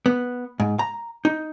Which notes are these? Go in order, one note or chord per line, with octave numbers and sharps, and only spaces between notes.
B3
G#2
A#5
D#4